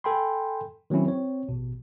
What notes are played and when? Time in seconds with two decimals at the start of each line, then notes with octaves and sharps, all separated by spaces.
0.04 A4 G5 G#5 B5 C6
0.90 D#3 F#3 A#3 C4 C#4 E4
1.06 C4 C#5
1.48 A1 B2